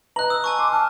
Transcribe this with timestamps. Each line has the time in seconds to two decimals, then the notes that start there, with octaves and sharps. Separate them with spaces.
0.16 B4 D#5 A#5 F#6 F#7
0.30 D#6 E6
0.44 G#5 A5 C#6
0.59 C6 D6
0.72 A5 F6